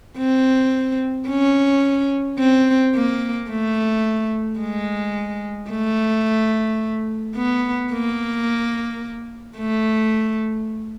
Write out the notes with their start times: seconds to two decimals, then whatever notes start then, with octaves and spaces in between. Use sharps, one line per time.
0.18 C4
1.28 C#4
2.39 C4
2.95 A#3
3.50 A3
4.60 G#3
5.70 A3
7.36 B3
7.92 A#3
9.57 A3